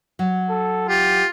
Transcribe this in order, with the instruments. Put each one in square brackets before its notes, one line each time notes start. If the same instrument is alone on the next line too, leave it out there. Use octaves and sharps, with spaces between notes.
[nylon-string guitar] F#3
[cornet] A4
[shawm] F4 [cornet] G4